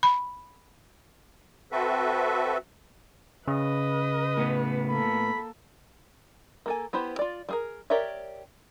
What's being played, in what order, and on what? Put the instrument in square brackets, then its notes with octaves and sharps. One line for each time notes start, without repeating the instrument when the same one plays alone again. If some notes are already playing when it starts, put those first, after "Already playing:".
[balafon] B5
[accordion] C4 F#4 A4 B4 E5
[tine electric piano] C#3 [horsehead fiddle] B4 [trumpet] D#5
[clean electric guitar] A2 B3
[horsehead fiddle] A#3 A4 [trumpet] B5
[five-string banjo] A#3 A4 G#5
B3 E4 G4 C5
F4 D5
G3 G#4 A#4
G4 A#4 C#5 D5 E5